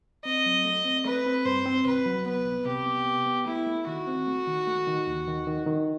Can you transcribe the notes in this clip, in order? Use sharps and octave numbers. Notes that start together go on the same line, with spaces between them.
C4 D#5
F#3
A3
C4
A3 B4
C4
G2 C5
C4
C2 B4
F#3
B3 B4
C2
C3 G4
B3
B3
B3
A3 E4
A3
D#3 F#4
C4
A3
D#3
A3
D#3
D#2
D#3
D#3
D#3